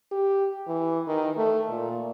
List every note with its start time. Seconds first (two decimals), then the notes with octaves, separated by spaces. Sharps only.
0.12 G4
0.68 E3
1.07 D#3
1.37 A3
1.70 A#2